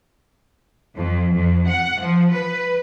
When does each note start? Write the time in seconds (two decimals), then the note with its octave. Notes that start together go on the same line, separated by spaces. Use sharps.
0.95 F2
1.36 F2
1.69 F#5
2.02 F3
2.34 B4